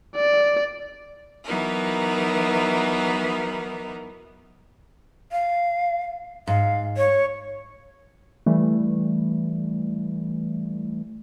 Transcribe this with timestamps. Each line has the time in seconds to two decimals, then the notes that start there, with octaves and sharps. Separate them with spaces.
0.15 D5
1.44 E3 F#3 B3 D#4 A#4
5.32 F5
6.47 G#2 F5
6.97 C#5
8.46 E3 G3 A3